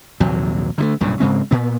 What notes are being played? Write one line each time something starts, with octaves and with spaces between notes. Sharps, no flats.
A#1 D#2 C3 F#3
D3 E3 A3
B1 G2 A#2 C#3
G#2 C#3 G#3 C4
A#2 B3